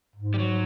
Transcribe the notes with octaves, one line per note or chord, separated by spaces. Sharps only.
G#2
G3
F#3